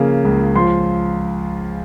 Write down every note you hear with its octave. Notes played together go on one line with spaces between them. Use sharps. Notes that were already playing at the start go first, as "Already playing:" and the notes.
Already playing: C#3 F3 A#3
C#2
F3 C6